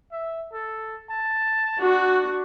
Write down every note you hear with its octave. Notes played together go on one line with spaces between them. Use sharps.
E5
A4
A5
D4 F#4